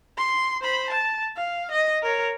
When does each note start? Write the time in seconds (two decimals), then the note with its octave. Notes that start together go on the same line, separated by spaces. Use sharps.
0.18 C6
0.61 C5 B5
0.91 A5
1.37 F5
1.72 D#5
2.03 A#4 C#5